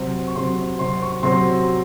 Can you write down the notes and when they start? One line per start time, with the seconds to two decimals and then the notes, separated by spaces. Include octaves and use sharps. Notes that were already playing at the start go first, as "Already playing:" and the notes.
Already playing: C3 F#3 C4
0.27 C#6
0.36 C3 F#3 C4 C6
0.79 C3 F#3 C4 C6
1.02 C#6
1.23 C3 F#3 C4 C6